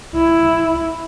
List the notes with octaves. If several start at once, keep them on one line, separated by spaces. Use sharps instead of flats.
E4